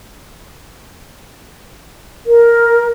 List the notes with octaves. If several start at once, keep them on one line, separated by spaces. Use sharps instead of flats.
A#4